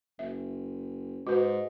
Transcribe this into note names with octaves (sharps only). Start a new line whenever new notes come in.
F#1 E5
G#2 F#4 B4